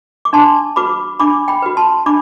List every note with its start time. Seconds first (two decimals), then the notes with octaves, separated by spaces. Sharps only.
0.25 D6
0.33 D4 A5 C6
0.76 F#4 B4 B5 D6
1.20 D4 B5 D6
1.48 G5 B5
1.62 F#4 B4
1.77 A5 C6
2.06 D4 B5 D6